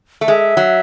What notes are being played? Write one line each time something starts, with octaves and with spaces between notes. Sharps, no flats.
A3
G#3 E5
F#3